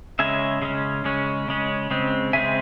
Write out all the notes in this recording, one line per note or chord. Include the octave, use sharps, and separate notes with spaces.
C#3 G#3 C#4 E5 G#5
C#3 G#3 C#4
C#3 G#3 C#4
C#3 G#3 C#4
C#3 G#3 C4
C#3 G#3 C4 E5 G#5